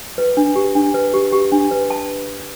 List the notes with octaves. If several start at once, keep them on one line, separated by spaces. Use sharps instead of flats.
B4
D4
G4
D4
B4
G4
G4
D4
B4
A5